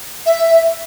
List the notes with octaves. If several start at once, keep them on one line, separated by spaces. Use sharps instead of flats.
E5